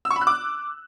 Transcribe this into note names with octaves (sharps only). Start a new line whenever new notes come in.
E6
C#6
B5
F#6
D6